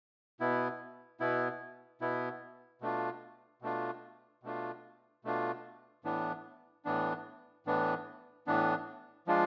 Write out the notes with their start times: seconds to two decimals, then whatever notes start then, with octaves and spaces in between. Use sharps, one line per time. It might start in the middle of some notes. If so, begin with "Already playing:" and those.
0.40 B2 B3 E4
1.20 B2 B3 E4
2.01 B2 B3 E4
2.81 B2 A3 D4 F4
3.62 B2 A3 D4 F4
4.43 B2 A3 D4 F4
5.24 B2 A3 D4 F4
6.04 A2 E3 B3 D4
6.85 A2 E3 B3 D4
7.66 A2 E3 B3 D4
8.47 A2 E3 B3 D4
9.27 F3 G#3 D4 F4